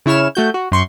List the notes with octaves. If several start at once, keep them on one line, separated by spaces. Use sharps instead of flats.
C#3 E4 C#5 F6 E7
A3 F#4 G6
F#4
F#2 C6 C#6